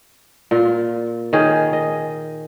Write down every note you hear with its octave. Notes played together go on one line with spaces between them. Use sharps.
A#2 F4
D#3 C#4 G#4
D#5